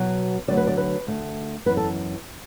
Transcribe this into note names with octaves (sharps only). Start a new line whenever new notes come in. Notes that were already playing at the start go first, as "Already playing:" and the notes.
Already playing: B2 F#3 B3
D2 D3 F#3 B3 D5
B4
D5
B4
D2 D3 A3
F#2 E3 B3 B4
A4